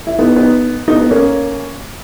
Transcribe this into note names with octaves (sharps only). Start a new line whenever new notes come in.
E4
B3 D#4
B3 D#4
B3 D#4
B3 D#4
A#3 C#4